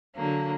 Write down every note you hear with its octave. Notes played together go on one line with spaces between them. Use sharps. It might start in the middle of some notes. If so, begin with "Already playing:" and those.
D3 F#3 A#3